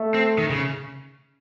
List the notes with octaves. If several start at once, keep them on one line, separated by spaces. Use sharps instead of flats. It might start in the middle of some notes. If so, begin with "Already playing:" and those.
Already playing: A3
C4
D#3
C#3